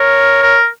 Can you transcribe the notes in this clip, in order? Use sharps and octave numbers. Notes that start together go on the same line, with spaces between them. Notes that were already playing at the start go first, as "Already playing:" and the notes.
Already playing: A#4 C#5
A#4